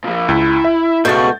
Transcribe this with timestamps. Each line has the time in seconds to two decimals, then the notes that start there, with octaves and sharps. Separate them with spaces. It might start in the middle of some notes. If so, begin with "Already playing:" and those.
0.04 A#2 F3
0.28 C#2 E4
0.65 E5
1.05 C#2 B2 A3 F#4 G6 A6